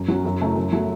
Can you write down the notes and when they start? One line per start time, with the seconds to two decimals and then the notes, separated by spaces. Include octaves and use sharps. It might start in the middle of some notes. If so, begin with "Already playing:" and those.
Already playing: F#2
0.08 F#3 C#4
0.25 F#2
0.40 C#3 A3 C#4 E4
0.56 F#2
0.73 F#3 A3